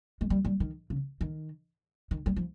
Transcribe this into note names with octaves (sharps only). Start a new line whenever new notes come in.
G#3
G3
G3
D#3
C#3
D#3
D#3
G3
F3